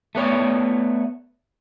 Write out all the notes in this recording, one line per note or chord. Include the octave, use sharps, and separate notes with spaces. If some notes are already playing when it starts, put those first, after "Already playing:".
A3 B3 C#5 D5